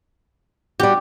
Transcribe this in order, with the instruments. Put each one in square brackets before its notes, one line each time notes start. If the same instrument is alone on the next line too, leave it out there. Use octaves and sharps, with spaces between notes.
[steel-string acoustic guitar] G3 F#4 [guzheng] G4